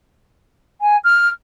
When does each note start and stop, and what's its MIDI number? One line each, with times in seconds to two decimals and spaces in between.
0.81 0.97 80
1.04 1.29 89